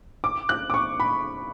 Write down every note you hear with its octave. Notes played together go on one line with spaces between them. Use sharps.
D6
F#6
D6
C#6
B5